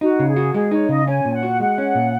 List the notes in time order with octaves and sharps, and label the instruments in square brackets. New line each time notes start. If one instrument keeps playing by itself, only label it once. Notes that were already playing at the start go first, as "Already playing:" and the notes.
[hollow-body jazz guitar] D#4 [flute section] F#4
[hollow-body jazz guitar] C#3
[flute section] G#4
[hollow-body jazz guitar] F#4
[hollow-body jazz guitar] G#3 [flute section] G#4
[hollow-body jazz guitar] D#4 [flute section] C#5
[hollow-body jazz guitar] C#3 [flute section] D#5
[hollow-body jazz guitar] C#4 [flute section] G#5
[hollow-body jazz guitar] A#2
[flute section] F#5
[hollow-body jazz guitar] F#4
[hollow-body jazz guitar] G#3 [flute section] F#5
[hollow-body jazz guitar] C#4
A#2